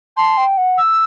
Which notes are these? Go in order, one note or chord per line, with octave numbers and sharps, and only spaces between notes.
A5 C6
G5
F#5
E6